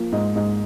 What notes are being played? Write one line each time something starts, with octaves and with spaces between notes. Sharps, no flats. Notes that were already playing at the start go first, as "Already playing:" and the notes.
Already playing: F3 A#3
G#2
G#2